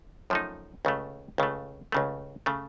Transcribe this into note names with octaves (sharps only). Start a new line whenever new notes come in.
F#2 F3 A3 D#4
C#2 C#3 A3
C#2 C#3 A3
C#2 C#3 A3
C#3 A3